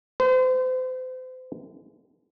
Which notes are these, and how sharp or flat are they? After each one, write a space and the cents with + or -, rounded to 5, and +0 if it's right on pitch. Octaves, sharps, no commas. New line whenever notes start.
C5 -35